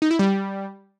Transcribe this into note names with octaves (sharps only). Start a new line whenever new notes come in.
D#4
E4
G3